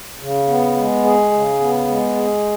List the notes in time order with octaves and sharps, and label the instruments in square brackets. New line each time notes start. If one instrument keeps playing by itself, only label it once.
[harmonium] C#3
B3
G#3
G#4
C#3
B3
G#3
G#4